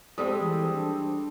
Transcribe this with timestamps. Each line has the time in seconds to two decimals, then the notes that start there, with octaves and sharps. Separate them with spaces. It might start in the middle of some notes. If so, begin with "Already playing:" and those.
0.18 G3 G#3 C4 A4 D#6
0.39 E3
0.73 D4